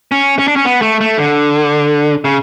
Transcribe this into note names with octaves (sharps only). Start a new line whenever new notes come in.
C#4
C#4
D4
C#4
B3
A3
A3
D3
C#3